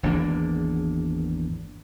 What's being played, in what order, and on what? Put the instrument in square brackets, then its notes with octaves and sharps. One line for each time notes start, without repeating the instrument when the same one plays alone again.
[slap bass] G#1 E2 A#3 D4